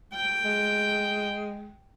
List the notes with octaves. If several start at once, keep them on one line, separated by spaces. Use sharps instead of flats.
G5
G#3